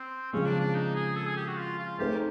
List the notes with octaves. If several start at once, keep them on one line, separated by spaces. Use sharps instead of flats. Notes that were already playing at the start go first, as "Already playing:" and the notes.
Already playing: C4
C#3 F3 G#3 C4 C#4
D4
D4
D#4
G#4
A4
G#4
G4
F#4
F4
F4
A3 C4 D#4 G4 G#4 C5